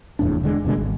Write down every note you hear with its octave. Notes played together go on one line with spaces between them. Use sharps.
F1 E2 A2 D4
E1 D3 G#3
G2 B2 D3 G#3
G#1